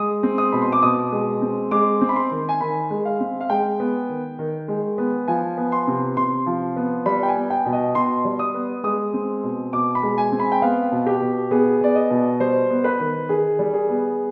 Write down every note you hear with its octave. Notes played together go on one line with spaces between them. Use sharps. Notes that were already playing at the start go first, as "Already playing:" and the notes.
Already playing: G#3 D#6
C4
D#6
B2 B5
C6
D6
B2 D#6
G#3
C4
G#3 D6
C4
B5
C6
D#3
G#5
D#3 B5
G#3
F5
C4
F5
G#3 G5
B3
D#3
D#3
G#3
B3
F3 G#5
B3
C6
C3
C3 C6
F3
B3
G3 B5
G5
G#5
B3
G5
B2
D#5
B2 C6
G3
D#6
B3
G#3 D#6
C4
B2
B2 D6
B5
G#3
G#5
C4
B5
G5
B3 F5
B2
G4
B2
B3 G#4
B3 D5
D#5
B2
G3 C5
B3
B4
D#3
D#3 G#4
G3
G#4
B3